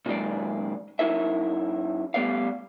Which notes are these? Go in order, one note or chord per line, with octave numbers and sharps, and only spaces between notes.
A#2 D3 D#3 F#3 G#3 D5
F#2 D#4 E4 A#4 E5
G3 A3 B3 A#4 D5 F5